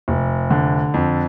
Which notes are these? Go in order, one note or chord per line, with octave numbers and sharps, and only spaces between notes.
F1
D3
F2